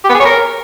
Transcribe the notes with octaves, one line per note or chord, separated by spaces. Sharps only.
G4
B3
G#4
C#5
A#4